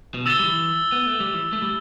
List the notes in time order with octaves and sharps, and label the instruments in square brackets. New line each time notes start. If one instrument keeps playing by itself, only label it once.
[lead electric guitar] B2
[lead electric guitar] D3 [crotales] E6 A6 G7
[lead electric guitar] G3
E3
B3
A3
G3
E3
A3
G3